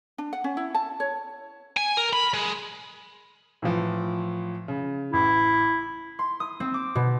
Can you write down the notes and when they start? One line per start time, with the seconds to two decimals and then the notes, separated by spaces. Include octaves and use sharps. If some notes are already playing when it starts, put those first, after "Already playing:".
0.18 D4
0.33 F#5
0.44 C#4
0.57 E4
0.75 A5
1.00 C#5
1.77 G#5
1.97 A#4
2.13 B5
2.34 G#3
3.62 A2 E3 F3
4.68 C#3
5.13 A1 E4
6.19 C6
6.40 D#6
6.60 C4
6.74 D6
6.95 B2